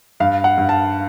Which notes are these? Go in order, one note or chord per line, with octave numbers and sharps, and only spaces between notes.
G2 F5
F#5
G2
A5